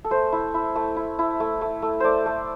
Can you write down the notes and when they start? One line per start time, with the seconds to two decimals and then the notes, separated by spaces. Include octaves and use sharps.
0.04 A4
0.11 A3 C5
0.32 E4
0.54 E4
0.75 A3
0.96 E4
1.19 E4
1.40 A3
1.61 A3
1.82 A3
2.00 A3 C5 D5
2.26 A3